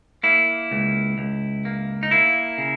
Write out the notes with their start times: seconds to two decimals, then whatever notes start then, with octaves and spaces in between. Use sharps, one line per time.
0.23 A#3 E4
0.71 C#2
1.18 C#2
1.65 A#3
2.03 D#4
2.11 A#3 E4
2.58 C#3